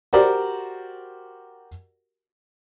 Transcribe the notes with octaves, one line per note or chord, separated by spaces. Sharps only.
F#4 G4 A#4 C5 D5